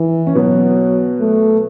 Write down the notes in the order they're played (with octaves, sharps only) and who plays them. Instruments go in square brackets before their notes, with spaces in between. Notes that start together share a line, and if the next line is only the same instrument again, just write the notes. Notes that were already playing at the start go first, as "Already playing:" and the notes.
Already playing: [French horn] E3
[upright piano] C#4
[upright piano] B2 B3 [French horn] F#3
[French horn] A3